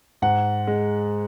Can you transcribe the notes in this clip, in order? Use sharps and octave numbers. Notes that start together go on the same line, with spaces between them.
G#2 F#5
G#3